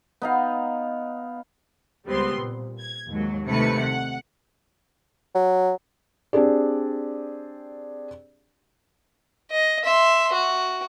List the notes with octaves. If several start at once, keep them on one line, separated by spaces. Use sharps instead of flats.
B3 D#4 F5
C#2 G3 B3 C4 C6
A#2
G#6
D#2 G#2 F#3
C2 C3 D#3 A3 B4 C#7
F#5
F#3
C4 D4 G4 G#4 D5
D#5
E5 C6
F#4